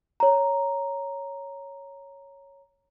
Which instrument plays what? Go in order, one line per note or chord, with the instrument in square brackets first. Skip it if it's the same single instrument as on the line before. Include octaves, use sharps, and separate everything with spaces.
[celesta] C#5 A#5